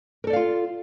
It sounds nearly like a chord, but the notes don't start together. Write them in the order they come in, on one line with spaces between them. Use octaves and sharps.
A#4 A4 D5 F5 F4